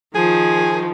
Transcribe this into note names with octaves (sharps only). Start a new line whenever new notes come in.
D#3 F3 G#4